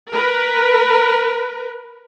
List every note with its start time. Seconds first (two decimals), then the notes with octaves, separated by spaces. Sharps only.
0.12 A#4 B4